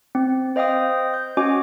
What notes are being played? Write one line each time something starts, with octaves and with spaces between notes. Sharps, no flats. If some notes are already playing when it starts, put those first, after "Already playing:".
C4
C5 D#5 F5 G5 D#6
G6
C#4 F#4 D#5 G#5 D6